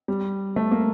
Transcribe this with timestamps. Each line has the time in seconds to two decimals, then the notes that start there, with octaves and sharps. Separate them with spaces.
0.08 G3
0.56 A3
0.71 A#3